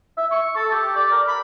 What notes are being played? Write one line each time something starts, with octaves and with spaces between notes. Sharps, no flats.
E5
C#6
A4
G4
D5
A#4
B5